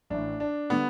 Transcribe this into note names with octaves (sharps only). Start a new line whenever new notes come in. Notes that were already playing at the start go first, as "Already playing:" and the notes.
A1 A2 E3 D4
D4
D3 G3 B3